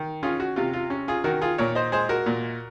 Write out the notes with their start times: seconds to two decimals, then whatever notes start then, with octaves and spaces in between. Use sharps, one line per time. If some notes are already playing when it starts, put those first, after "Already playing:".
Already playing: D#3
0.23 C#4 F4 G#4
0.40 F#4
0.56 C3 F4
0.73 F4
0.90 C#4
1.08 F4 G#4
1.24 D#3 F#4 A#4
1.41 F4 G#4
1.58 A#2 A#4 C#5
1.75 C5 D#5
1.92 G#3 G#4 C5
2.09 F#4 A#4
2.26 A#2